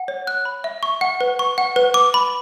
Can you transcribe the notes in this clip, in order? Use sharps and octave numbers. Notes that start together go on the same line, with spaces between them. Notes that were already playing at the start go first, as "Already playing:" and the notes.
Already playing: F#5
C#5
F#6
B5
E5
C#6
F#5
B4
C#6
F#5
B4
D6
B5